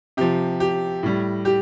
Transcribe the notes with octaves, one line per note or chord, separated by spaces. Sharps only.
C3 F3 G4
G4
A2 G3
G4